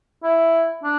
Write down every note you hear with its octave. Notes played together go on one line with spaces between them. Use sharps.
E4
D4